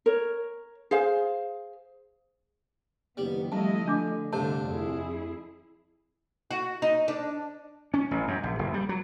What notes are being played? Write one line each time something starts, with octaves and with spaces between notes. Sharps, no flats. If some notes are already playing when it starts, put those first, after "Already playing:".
A#4 C#5
G#4 C5 F5
F#1 D#3 G3 B3
F2 G3 A3 E4 D#5 A5
D3 A3 D4 D6
C2 G2 D3 A#4 C5 C#5 A5
F2 E4 G#4
F#4
D#4
D4
C#4
A1
F#2
A#1
F#1
G3
F#3